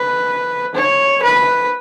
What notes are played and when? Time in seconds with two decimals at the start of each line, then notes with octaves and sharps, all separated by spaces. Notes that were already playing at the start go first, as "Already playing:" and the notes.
Already playing: B4
0.75 C#5
1.23 B4